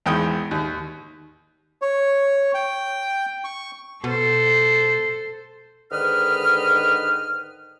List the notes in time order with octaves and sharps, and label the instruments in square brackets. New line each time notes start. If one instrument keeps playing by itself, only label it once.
[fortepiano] G#1 E2 G5 D#6
D#2
[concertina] C#5
G5
C#6
[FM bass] B2 [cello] A4 C5
[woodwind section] G#2 D3 D#3 B4 D#5 F6